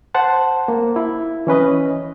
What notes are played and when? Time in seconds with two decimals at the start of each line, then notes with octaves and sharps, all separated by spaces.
0.14 C5 F#5 A5
0.68 A#3
0.96 E4
1.47 E3 C#4 B4 D#5